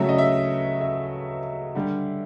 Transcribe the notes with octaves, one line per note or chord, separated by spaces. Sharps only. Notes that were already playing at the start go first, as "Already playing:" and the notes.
Already playing: C#3 F#3 A3 E5
D#5
E5
E5
D3 G3